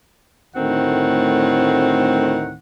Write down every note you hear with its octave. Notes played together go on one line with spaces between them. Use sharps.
D2 A2 D#3 C4 F#5